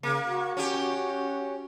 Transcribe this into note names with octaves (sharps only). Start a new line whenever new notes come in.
C#3 A#3
F#4
C#4 G4